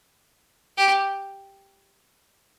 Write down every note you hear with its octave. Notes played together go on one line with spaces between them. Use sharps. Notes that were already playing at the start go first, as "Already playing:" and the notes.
G4